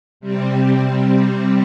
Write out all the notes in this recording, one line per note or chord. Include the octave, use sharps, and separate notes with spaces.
C3 G3 C4